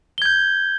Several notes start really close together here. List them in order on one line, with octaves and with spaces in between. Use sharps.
G7 G#6 G6